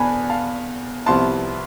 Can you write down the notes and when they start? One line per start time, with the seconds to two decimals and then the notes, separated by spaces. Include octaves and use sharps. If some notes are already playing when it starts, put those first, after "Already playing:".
Already playing: E2 B2 B3 D4 G#5 A5 B5
0.30 F5 A5
1.06 C2 C3 F3 B3 E4 A5 C6